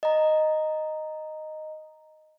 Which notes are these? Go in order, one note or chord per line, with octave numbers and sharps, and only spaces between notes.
D#5 A#5